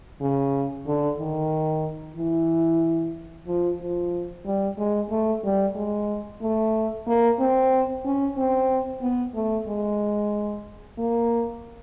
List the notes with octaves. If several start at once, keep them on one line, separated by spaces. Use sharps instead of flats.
C#3
D3
D#3
E3
F3
F3
G3
G#3
A3
G3
G#3
A3
A#3
C4
C#4
C4
B3
A3
G#3
A#3